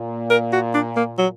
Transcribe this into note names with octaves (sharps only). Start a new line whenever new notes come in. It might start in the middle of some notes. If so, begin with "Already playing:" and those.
Already playing: A#2
A#4
F#4
D4
A#3
F#3